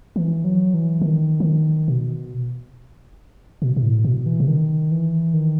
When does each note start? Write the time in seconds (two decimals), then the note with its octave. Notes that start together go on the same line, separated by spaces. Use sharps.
0.16 E3
0.44 F#3
0.74 E3
1.02 D#3
1.40 E3
1.45 D#3
1.88 B2
3.62 B2
3.76 B2
3.83 A2
4.05 B2
4.26 E3
4.40 C3
4.48 D#3
4.91 E3
5.34 D#3